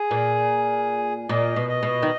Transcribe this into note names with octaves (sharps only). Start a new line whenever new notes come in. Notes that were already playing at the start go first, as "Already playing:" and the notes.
Already playing: G#4
A#2
A#2 D#5
B2
D#5
B2
D#3